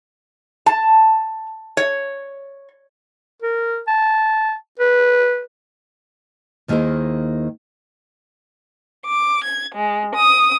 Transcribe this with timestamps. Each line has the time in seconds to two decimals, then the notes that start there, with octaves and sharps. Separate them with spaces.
0.66 A5
1.77 C#5
3.42 A#4
3.88 A5
4.79 B4
6.68 D#2 D#3 A#3 E4 G#4 C5
9.07 D6
9.45 G#6
9.75 G#3
10.15 D#6